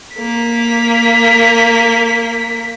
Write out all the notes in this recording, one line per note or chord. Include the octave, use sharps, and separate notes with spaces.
A#3 B6